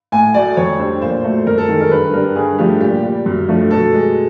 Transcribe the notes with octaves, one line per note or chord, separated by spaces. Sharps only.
A2 G#5
F#3 A3 D5
F2 C#5
D3 G3 C5
A#2 C5
F#3 A3
F#2 A#4
A4
D#3 G#3
A#4
G2 B4
D3 G3 A#4
G2 G#4
D3 F3 A3 G4
A#2 G4
G3
F#2
D3 F3 A3
B2 A4
G#3